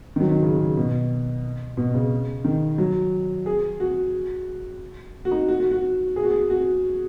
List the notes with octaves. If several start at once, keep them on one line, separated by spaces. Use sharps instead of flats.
D#3
F#3
D#3
C#3
C#3
B2
B2
C#3
D#3
F#3
G#4
F#4
F#4
D#4
F#4
F#4
F#4
G#4
F#4
G#4
F#4